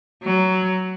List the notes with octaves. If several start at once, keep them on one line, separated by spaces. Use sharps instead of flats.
F#3